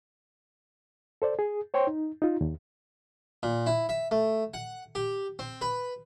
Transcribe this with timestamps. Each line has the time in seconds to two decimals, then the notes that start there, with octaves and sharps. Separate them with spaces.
1.22 A4 C5 D5
1.39 G#4
1.74 C5 C#5 G5 C6
1.87 D#4
2.22 D#4 F4
2.41 D#2
3.43 A#2
3.67 E4
3.89 E5
4.11 A3
4.54 F#5
4.95 G4
5.39 C4
5.61 B4